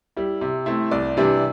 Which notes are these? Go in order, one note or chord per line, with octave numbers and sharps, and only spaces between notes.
G3 E4
C3
A3 C4 E4
C2 D5
C3 E3 G3 D4